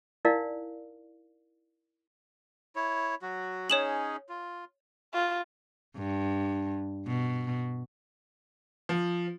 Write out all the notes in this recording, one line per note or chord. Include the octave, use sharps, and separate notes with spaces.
D#4 E4 A#4 D5 F5
E4 C#5
F#3 F#4
C#4 D#4 G#4 C#5 E7 F#7
F4
F4
G2
B2
F3